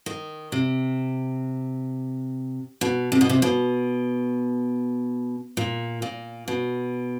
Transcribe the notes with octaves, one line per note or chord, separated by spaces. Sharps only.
D#3
C3
B2
C3
B2
C3
B2
A#2
A#2
B2